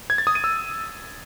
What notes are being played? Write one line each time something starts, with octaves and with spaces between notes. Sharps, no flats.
G#6
A6
D#6
D#7
E6